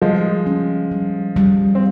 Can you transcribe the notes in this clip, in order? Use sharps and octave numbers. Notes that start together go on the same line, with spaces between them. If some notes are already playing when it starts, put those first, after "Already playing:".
F3 G3 G#3
C#4
G3
G3
C4